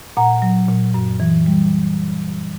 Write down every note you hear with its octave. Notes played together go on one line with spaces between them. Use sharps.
A#2 F#5 A#5
F#3
A#2
F#2
E3
G3